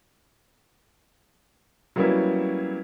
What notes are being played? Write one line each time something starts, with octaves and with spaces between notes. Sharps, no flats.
F#3 G3 A#3 B3 C#4 E4